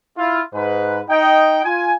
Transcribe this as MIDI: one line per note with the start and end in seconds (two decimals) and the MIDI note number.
0.17 0.40 64
0.17 0.40 65
0.53 1.00 44
0.53 1.00 71
1.09 1.62 63
1.09 1.62 75
1.09 1.62 79
1.64 1.93 65
1.64 1.93 80